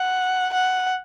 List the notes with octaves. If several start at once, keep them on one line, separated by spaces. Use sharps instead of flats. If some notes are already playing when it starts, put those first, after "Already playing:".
Already playing: F#5
F#5